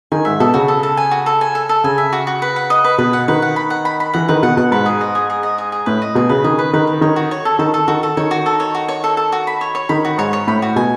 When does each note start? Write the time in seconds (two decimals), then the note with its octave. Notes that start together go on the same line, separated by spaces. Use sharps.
0.12 D#3 G#5
0.25 G#2 E5
0.40 B2 A4
0.54 C#3 F#4
0.68 A4
0.83 A4
0.97 G#5
1.11 F#4
1.26 A4
1.41 G#5
1.55 A4
1.69 A4
1.84 C#3 G#5
1.98 E5
2.13 F#4
2.27 F#4
2.42 B4
2.56 F#5
2.70 D#5
2.84 B4
2.98 B2 B4
3.13 F#5
3.28 D#3 B4
3.42 F#5
3.56 B5
3.70 F#5
3.85 B5
4.00 B5
4.13 E3 F#5
4.28 D#3 B4
4.43 B2 F#5
4.57 B2 F#5
4.71 G#2 B4
4.86 G#4
5.01 D#5
5.15 G#4
5.30 G#4
5.43 D#5
5.58 G#4
5.72 G#4
5.86 A2 B4
6.02 D#5
6.15 B2 G#4
6.29 C#3 B4
6.44 D#3 G#4
6.59 B4
6.73 D#3 B4
6.87 B4
7.01 D#3 C#5
7.16 F#4
7.31 C#5
7.45 A4
7.59 D#3 A4
7.74 A4
7.88 D#3 F#4
8.03 A4
8.17 D#3 C#5
8.31 F#4
8.46 A4
8.60 C#5
8.75 F#4
8.88 C#5
9.04 A4
9.17 A4
9.32 F#4
9.47 B5
9.61 C#5
9.75 C#5
9.89 D#3 B5
10.05 F#4
10.18 G#2 C#5
10.33 C#5
10.47 A2 B5
10.62 F#4
10.76 B2 G#5